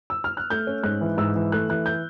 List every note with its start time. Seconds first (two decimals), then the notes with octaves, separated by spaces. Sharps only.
0.10 E6
0.24 F6
0.37 F#6
0.50 A3 G6
0.67 C#4
0.83 G#2 F#6
1.01 E3
1.18 G#2 E6
1.36 E3
1.52 A3 F#6
1.69 E3 F#6
1.86 G6